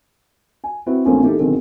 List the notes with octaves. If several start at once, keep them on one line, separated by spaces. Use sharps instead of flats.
G#5
C4 E4 F#4 B4
A#1 A3 A#3 C4 C#4 F4
E3 A#3 D#4 G4 A4
G#1 B2 D3 C4 G#4 A#4